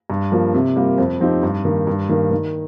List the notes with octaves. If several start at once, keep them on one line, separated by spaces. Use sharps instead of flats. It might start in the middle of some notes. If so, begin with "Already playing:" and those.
G2
F3 A#3 F4
C3
G3 A#3 F4 A#4
F2
F3 C4 D#4 G4
G2
D#3 A#3
G2
D#3 A#3
D#3